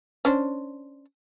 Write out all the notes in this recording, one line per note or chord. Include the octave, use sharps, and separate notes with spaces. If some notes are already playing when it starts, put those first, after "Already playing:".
C#4 D4 C5